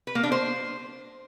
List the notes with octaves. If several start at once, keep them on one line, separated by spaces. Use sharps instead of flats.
B4
A#3
D4
C5